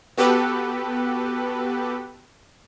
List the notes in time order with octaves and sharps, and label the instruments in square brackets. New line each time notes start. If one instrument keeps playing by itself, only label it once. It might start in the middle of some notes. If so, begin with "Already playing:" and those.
[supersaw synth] B3 F#4 G4 A4 B4